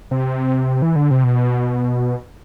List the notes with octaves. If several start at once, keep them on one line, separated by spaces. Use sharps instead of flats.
C3
E3
D3
C3
B2